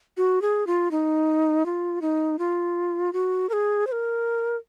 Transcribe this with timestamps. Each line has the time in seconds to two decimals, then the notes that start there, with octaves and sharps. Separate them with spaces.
0.17 F#4
0.42 G#4
0.67 F4
0.91 D#4
1.66 F4
2.02 D#4
2.39 F4
3.13 F#4
3.49 A#4
3.53 G#4
3.87 C5
3.92 A#4